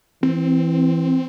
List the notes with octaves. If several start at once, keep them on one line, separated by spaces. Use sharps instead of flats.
E3 C4